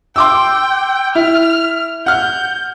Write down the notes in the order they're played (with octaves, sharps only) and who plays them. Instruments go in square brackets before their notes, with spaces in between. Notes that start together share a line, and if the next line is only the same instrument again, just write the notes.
[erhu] G5 [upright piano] C6 D6 E6
[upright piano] E4 [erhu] F6
[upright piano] F#5 F6 [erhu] G6